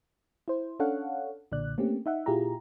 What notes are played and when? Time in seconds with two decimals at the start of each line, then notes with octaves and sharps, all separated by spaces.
0.48 E4 C5
0.79 C#4 D4 A4 C#5 F5 F#5
1.52 B1 A#2 D3 D5 F#6
1.78 A3 A#3 C4 C#4 G4
2.06 D#4 E5 F#5
2.26 A#2 E4 F4 G4 G#4 A#5